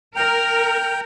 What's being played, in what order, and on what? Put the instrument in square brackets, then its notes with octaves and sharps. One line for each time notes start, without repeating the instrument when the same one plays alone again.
[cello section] A#4 [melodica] G5 [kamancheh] F6